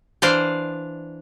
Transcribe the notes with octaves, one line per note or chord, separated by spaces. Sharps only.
E3 D4 C5 D5 F5